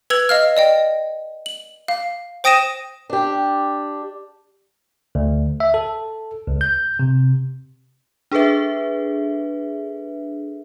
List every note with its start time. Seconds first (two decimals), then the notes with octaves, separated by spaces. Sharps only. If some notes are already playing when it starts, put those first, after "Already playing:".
0.10 B4 E6 G#6 F7 F#7
0.29 D#5 F5 F6
0.57 D5 D#5 G5
1.46 F#7
1.88 F5
2.44 C5 G5 D#6 A#6 D#7 E7
3.10 D4 G4
5.15 D2
5.60 E5
5.74 A4
6.47 C#2
6.61 G6
6.99 C3
8.31 D4 G#4 A4 B4 E5